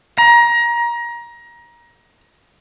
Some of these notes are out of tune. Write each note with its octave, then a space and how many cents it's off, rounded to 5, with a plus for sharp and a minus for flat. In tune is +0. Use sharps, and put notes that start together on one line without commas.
A#5 +25